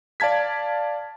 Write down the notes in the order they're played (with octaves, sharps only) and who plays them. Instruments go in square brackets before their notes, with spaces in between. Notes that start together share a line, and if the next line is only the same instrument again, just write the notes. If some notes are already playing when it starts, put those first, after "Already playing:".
[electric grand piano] D5 F5 A5 G#6 B6